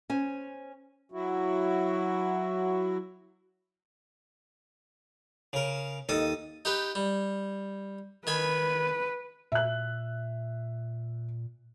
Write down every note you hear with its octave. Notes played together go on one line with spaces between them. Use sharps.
C#4 C5 G#5
F#3 E4 F#4
C#3 A#4
D#2 A4 D#5 D#6
D#4 G4 B4
G3
D#3 B4 G#5 B5
A#2 E5 F#6